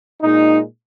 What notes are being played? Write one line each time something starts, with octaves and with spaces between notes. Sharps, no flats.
A#2 G#3 D#4